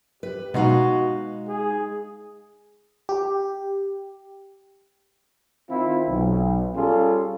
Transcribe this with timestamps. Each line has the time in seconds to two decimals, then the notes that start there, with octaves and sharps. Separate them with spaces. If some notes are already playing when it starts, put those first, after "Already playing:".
0.23 G4 B4
0.54 B2 G#3 D#4 F#4 F5
1.48 G#4
3.09 G4
5.70 D#3 C4 E4 F4
6.09 B1
6.75 G3 C#4 F4 G#4 A4